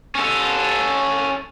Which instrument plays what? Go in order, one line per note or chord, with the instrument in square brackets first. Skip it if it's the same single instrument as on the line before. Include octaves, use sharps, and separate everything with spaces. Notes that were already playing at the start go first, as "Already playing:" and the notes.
[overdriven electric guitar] C#4 A4